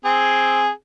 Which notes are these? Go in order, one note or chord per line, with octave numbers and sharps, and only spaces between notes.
C4 G#4